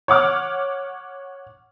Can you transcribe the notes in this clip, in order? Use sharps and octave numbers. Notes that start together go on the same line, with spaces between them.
C#5 F#5 D6 F6